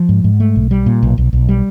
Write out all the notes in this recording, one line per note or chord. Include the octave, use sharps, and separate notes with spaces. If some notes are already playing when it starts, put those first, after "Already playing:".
Already playing: F3
G#2
G#2
A3
B1
G3
A#2
B1
B1
B1
G3